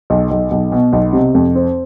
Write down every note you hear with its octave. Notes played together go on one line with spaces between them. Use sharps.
B1
B1
B1
B2
B1
C3
F2
C4